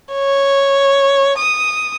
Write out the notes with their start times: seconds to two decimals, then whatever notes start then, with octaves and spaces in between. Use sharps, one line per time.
0.12 C#5
1.38 D#6